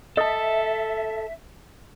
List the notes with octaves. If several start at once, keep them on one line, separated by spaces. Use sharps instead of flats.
A4 D#5 E5 A5 D#6